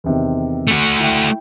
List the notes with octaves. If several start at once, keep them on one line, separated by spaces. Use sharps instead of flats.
E2 C3 D#3
A3 F#4
E4 G5